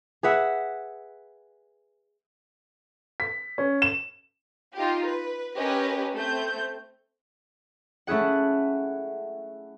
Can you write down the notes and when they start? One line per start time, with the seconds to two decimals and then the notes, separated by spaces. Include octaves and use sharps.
0.23 G#4 B4 E5 F#5
3.20 B6
3.58 C#4
3.82 E7
4.76 D#4 F4 G4
5.08 B4
5.55 C#4 G4 A#4 B4 D#5
6.15 A3 C4 G6
8.07 A3 C#4 E4 G#4 F#5